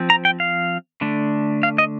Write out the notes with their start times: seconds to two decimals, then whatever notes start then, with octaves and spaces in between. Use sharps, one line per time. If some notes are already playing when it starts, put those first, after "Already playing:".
Already playing: F3 C4
0.10 A#5
0.25 G5
0.40 F5
1.01 D3 A3 D4
1.63 F5
1.78 D#5